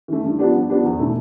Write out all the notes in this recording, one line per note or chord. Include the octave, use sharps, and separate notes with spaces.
E3 A3
G2
F3 B3 D4 G4
G2
F3 B3 D4 G4
E2
B2 A3 E4